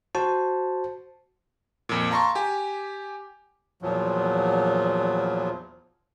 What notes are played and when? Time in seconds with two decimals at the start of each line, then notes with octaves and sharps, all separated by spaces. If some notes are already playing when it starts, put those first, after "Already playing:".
0.15 F#4 C5 A5
1.89 F2 A#2
2.11 F5 A5 A#5 C6 C#6
2.35 G4 G#5
3.82 E2 A#2 F3 F#3